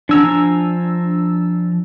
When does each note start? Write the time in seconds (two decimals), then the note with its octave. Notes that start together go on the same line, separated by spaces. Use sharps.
0.09 F3 D4 G#5 A#5 E6